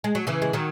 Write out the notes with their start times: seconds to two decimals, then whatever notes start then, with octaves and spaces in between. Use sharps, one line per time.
0.04 G#3
0.15 F#3
0.27 C#3 E3
0.42 G#3
0.53 D#3 F#3